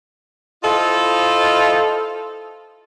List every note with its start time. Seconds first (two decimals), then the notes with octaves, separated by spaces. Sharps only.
0.64 E4 F4 A4 C5 D#5 F5